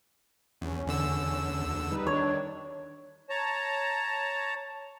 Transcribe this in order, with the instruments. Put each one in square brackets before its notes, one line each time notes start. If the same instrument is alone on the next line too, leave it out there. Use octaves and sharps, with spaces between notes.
[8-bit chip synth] E2 [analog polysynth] C#4
[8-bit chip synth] E2 D3 E6
[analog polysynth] D2
G3 D#4 B4
[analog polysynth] D#3 D4 [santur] C#5
[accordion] C#5 A5 A#5